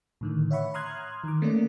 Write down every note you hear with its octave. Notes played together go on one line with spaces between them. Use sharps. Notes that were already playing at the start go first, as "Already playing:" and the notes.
A2 D3 D#3
C#5 E5 F#5 B5 C#6
A#5 C6 D#6 F6 F#6 G#6
D#3 D6
A3 A#3 C#4 D5